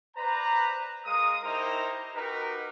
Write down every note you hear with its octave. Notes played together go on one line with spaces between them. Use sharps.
B4 C5 D5 A#5
G#3 A#4 F5 D#6
D#4 E4 G4 A#4 C5 A#5
D#4 F#4 G4 A#4 B4